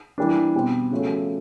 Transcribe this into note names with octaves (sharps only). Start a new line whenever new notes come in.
E3 G3 A#3 D4
B2 G3 C4
C#3 F3 A3 C#4 F#4